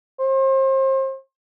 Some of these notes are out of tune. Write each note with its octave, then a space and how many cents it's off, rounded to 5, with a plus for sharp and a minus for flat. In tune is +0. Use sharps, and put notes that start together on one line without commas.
C5 +35